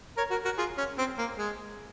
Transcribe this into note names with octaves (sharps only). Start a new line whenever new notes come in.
A#4 C#5
F#4 A#4
F#4 A#4
F4 G#4
C#4
C4
A#3
G#3